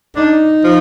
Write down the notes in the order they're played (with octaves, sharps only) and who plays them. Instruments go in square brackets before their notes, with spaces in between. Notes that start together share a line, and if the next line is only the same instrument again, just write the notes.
[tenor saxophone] D4 [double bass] D#4
[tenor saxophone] F3